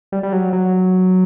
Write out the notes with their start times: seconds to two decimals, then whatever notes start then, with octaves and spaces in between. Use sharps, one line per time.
0.12 G3
0.23 G3
0.32 F#3
0.53 F#3